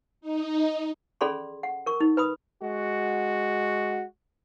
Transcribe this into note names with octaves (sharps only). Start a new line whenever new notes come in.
D#4
C#4 G#4 A4 D5 B5 C6
F#5
A#4 C#6
D#4
B4 B5 D#6
G#3 F#4